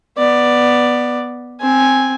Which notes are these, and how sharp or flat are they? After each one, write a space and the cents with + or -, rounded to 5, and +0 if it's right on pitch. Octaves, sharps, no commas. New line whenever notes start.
B3 -5 D5 +5
C4 +0 G#5 +0